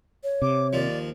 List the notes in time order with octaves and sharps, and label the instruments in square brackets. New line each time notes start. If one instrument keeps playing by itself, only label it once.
[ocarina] C#5
[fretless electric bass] C3 [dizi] D6
[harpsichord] D#2 F3 [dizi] D5